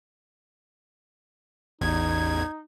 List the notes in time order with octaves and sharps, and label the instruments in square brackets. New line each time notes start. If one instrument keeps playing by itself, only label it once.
[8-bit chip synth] A1 E2 G#6 [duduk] D#4